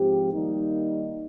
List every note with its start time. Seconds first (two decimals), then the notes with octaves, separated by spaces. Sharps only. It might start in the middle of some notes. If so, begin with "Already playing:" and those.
Already playing: G#2 F3 C4 G4
0.33 D#3 G3 A#3 D#4